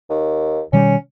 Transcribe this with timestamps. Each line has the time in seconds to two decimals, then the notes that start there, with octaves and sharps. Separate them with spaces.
0.10 D#2
0.73 B2 D#3 G3 C#4